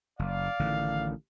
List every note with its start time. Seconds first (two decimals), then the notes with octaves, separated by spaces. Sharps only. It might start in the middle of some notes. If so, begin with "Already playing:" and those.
0.19 F#1 D5 F5
0.60 A1 D3 D#3